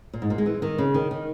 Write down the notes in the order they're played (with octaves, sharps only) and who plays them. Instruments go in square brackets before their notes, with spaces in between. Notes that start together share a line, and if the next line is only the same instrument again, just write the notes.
[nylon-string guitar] A#2
G#2
A#2
G#3
E3
D#3
C#3
D#3
D#3